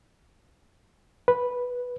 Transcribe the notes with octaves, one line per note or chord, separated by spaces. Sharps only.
B4